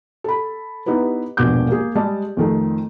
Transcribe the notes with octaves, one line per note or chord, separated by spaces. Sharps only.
A4 B5
B3 D#4 E4 G4 B4
E1 A#1 G2 B3 D6 G6
A#3 G#4
G3 G#3 D#5 A5
F2 D#3 A3